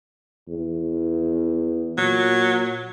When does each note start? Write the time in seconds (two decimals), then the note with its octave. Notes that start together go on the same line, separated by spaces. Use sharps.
0.48 E2
1.98 A#2 F#3